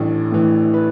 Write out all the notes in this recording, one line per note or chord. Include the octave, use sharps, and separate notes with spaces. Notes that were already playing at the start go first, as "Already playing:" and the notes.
Already playing: A1 A2 E3 D4 D5
A2 E3
B4